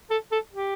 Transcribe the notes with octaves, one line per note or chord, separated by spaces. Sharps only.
A4
A4
G4